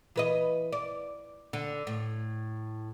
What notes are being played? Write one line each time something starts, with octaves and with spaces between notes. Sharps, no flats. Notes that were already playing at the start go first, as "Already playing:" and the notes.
E3 B4 D#5
D5
D3
A2